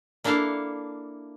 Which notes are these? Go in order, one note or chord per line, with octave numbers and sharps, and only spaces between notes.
A#3 D4 E4 A4 F5